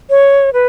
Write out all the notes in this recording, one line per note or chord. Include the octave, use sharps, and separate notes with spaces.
C#5
B4